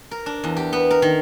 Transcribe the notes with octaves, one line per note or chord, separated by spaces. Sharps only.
A#4
D4
E2
G4
B3
A#4
D#3